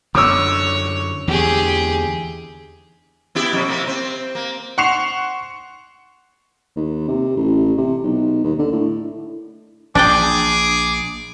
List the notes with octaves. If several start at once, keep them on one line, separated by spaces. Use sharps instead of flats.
F#2 D3 C#5 D6 E6
E2 D3 G4 G#4
B3 E4 G4
F2 B2 G3
C3 A#3
C4
A#3
F#5 C6 C#6 C7 E7 F7
D#2
C3
A1
C3
B1
D#2
D3
A2
A#1 D4 G#4 D5 G5 D6